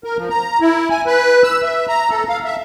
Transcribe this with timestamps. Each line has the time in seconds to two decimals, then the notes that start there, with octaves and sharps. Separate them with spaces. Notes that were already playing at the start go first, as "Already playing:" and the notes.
0.04 A#4
0.17 F3
0.30 A#5
0.60 E4
0.90 G#5
1.07 B4
1.43 E6
1.63 E5
1.89 A#5
2.10 A4
2.29 F5
2.45 E5